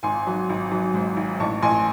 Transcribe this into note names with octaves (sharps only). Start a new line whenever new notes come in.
G#1 G#5 C6
F#3
G#1
F#3
G#2
G#1
A1 A5 C#6
A1 G#5 C6